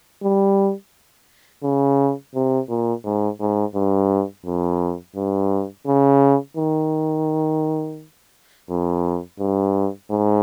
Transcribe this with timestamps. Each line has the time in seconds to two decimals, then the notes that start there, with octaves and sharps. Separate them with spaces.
0.23 G3
1.63 C#3
2.35 C3
2.69 A#2
3.04 G#2
3.40 G#2
3.75 G2
4.46 F2
5.16 G2
5.87 C#3
6.57 D#3
8.69 F2
9.39 G2
10.11 G#2